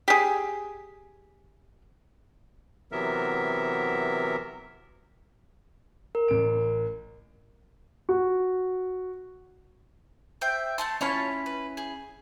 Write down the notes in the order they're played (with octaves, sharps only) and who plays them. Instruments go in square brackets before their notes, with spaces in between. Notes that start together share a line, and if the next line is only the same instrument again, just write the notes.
[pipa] G4 G#4
[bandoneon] C3 E3 F#3 B3 A#4 E5
[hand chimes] A#4
[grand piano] A1 D7
[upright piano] F#4
[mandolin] C5 E5 G5
A3 A5 C6
[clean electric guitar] C#4 E4 [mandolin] F4 C#5 A5
[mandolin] B4
G#4